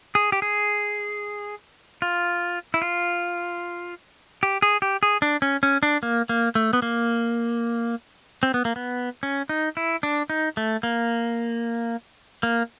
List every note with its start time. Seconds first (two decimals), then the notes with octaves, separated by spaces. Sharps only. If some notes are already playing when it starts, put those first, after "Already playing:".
0.15 G#4
0.32 G4
0.42 G#4
2.02 F4
2.74 E4
2.82 F4
4.43 G4
4.62 G#4
4.82 G4
5.03 G#4
5.22 D4
5.42 C#4
5.63 C#4
5.83 D4
6.03 A#3
6.29 A#3
6.55 A3
6.73 B3
6.82 A#3
8.43 C4
8.54 B3
8.65 A#3
8.76 B3
9.23 C#4
9.49 D#4
9.77 E4
10.03 D4
10.30 D#4
10.57 A3
10.83 A#3
12.43 A#3